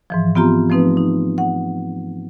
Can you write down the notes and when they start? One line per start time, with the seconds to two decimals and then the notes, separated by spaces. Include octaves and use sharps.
0.10 G#2 E3 F3
0.35 B3 C4 F4 G4 A#5 C6
0.69 F3 A3 C4 D#4 B4
0.97 D#4
1.38 F#5